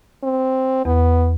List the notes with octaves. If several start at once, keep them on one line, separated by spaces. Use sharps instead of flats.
C4
E2 B3